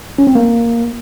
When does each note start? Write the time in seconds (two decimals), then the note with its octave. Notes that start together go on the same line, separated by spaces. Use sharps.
0.18 C#4
0.27 C4
0.35 A#3